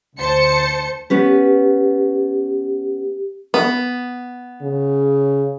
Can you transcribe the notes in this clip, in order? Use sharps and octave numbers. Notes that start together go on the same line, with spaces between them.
D2 C5 A5 C#7
B3 C#4 G4 B4
B3
C#3